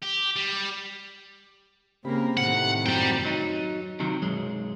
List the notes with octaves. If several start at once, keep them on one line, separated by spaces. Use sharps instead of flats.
G4
G3
C#3 A#3 C4 G4 A#4 B5
A2 C3 D#3 F#5
F#2 G3 C4 G5 A#5
F#3 D#4
C3 D#3 F#3
B1 F#2 G#3